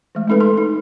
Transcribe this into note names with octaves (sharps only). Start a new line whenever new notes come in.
E3 G#3 A3
G#3 C4 D#4 A4 B4
A4 C6
D#4